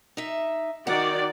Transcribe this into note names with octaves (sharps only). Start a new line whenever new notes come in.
D#4 E5
D#3 F#4 D5 F#5